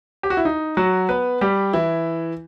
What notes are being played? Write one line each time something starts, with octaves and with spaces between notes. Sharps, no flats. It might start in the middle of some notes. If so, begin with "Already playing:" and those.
G4
F#4
E4
D#4
F#3 F#4
B3 B4
G3 G4
E3 E4